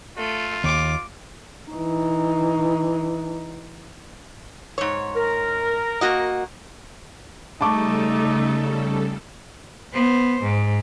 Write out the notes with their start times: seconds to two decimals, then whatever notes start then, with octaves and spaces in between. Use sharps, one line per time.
0.17 A3 F4
0.64 D#2 D6
1.72 E3 D#4
4.78 G#2 C#5
5.15 A#4
6.01 A#3 F#4 D#5
7.61 C#3 G3 A3 D#4 A4 A5 C#6 D6
9.94 B3 C5
10.43 G#2